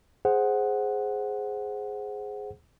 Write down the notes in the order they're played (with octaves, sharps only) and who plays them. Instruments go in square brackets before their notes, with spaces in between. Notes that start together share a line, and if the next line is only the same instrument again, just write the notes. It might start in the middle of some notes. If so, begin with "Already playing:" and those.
[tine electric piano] G#4 C5 F#5